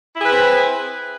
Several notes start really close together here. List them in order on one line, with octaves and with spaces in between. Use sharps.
E4 G#4 B4 C4